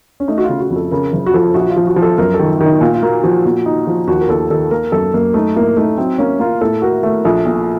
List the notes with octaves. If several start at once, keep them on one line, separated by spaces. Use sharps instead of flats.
C#4
A3 D#4
F#4
F4
C#3
F#4
F2
A4
C#3 A#4
F#1
F#4
F3 A4
A#1 F#4
F4
F3
F#4
F3
A4
F#2 A#4
A4
D#3
D#3 D#4
A#2 F4
F4
A#3 F#4
F3 F#4
A#2
D#4
F3
D#2 F#4
A#4
D#2 A4
D#3 A4
A#3 A#4
F#2 A4
F#2 A#3
A3 D#4
A2 A#3
A3 D#4
F#3 C4
A#3 C#4
A#3 F4
A2 A4
F#4 A#4
A3 A#4
A#1 A4
A#2